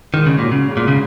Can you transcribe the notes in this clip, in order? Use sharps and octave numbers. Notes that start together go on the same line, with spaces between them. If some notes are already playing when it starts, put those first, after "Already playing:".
G#2 D#3
C#3
A#2 F#3
C#3
G#2
A#2
C#3